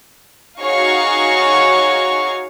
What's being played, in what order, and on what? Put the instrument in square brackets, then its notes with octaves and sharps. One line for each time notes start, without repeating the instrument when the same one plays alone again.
[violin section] D#4 F#4 G#4 C#5 F5 C#6